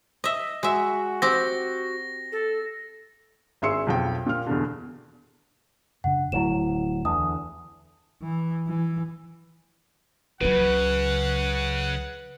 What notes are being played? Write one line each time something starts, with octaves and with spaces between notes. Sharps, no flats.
D#5 E5
G#3 F#4 E5
C4 G4 A#6
A4
G#1 G#4 E5 C6 E6 C#7
B1 F2 G5
A#2 F6
E2 B2 D3
F#2 C#3 D4 F#5
D1 D2 F#3 E4 E7
E2 D3 D#6
E3
E3
C#2 C#3 F#3 B4 F#5